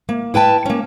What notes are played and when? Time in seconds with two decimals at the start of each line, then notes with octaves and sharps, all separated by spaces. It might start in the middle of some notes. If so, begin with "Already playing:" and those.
0.09 A#3
0.34 E4 B4 G5 A5
0.65 A#3 C#4